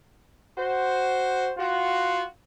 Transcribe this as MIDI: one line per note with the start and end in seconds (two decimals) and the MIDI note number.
0.59 1.52 66
0.59 1.52 72
1.58 2.24 65
1.58 2.24 66